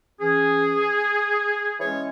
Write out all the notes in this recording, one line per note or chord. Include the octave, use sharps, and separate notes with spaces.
E3 C#4 G#4
E3 G#3 C#4 C#5